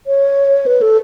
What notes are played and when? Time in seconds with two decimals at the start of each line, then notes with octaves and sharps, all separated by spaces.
0.07 C#5
0.66 B4
0.82 A4